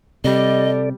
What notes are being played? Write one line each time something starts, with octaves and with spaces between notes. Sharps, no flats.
C3 G3 A4 D5 D#5